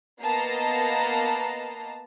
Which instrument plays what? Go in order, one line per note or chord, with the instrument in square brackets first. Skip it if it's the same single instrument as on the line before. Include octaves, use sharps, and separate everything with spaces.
[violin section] A#3 B3 D#5 A5 A#5 C7